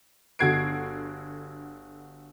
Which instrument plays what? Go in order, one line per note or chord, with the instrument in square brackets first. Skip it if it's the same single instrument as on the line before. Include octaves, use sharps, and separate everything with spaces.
[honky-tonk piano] G1 D3 F#4 G#6 C7 D7